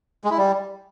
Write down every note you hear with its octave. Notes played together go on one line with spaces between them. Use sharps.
G#3
E4
G3